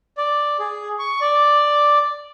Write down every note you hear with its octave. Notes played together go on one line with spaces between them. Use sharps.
D5
G#4
C#6
D5